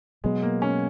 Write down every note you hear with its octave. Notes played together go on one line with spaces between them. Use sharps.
B2 F#3 G#3 B3
A#3
C#4